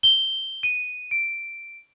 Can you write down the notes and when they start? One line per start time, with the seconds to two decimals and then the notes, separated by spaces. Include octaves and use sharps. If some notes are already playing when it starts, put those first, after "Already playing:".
0.03 G7
0.63 D#7
1.11 D7